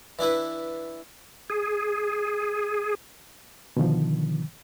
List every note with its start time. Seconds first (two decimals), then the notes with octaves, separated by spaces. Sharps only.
0.19 E3 D4 E4 B4
1.50 G#4
3.77 B2 D3 D#3 F3